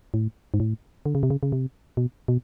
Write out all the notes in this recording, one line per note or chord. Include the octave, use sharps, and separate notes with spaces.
A2
G#2
A2
D3
C#3
C3
C#3
C#3
C3
B2
B2